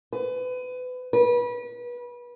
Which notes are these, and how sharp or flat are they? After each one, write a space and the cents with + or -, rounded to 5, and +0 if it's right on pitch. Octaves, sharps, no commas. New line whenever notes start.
B4 +30
B4 -30